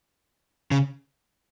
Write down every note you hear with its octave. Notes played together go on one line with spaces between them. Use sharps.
C#3